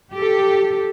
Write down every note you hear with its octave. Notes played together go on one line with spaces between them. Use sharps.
G4 A4